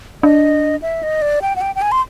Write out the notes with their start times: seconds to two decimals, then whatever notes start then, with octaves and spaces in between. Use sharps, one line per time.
0.23 D4 D#5
0.82 E5
1.03 D#5
1.22 D5
1.42 G5
1.56 F#5
1.61 G5
1.75 G5
1.82 G#5
1.92 C6